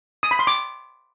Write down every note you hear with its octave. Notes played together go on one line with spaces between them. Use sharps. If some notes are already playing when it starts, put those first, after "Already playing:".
D#6
B5
C6
D6